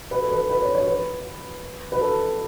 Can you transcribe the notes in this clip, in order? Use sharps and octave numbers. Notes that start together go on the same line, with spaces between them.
B4
A4
B4
B4
C#5
C#5
B4
B4
A4